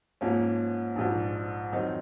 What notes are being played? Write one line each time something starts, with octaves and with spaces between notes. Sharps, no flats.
G#2 F3 A#3 C#4
A#1 G#2 F3
F2 D#3 F#3 C4 D#4